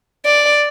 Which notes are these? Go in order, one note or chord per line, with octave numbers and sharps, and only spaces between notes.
D5